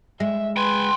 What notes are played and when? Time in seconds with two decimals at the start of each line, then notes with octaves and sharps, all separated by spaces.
0.20 G#3 E5
0.57 B4 G5 G#5 C6